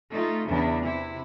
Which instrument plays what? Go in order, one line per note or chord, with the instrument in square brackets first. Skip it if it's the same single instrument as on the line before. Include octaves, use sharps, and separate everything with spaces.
[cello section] A3 D#4 F4
E2 C#3 D4 E4
C3 E4